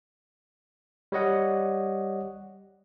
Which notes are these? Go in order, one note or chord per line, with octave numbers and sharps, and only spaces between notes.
G3 C#5 D#5 F#5